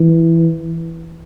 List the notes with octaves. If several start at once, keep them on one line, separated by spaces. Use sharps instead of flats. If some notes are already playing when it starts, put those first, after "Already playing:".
Already playing: E3